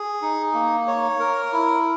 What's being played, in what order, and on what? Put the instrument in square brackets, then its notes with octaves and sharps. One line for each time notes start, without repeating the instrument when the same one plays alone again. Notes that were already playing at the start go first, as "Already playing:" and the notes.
Already playing: [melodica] G#4
D#4
A#3
C#5
A#4
E4